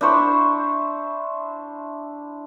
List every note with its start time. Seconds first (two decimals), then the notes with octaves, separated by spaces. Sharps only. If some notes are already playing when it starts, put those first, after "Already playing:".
0.01 D4 E4 C5 C#6